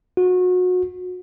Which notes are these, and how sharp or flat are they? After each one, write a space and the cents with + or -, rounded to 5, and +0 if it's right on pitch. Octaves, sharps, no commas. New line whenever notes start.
F#4 -30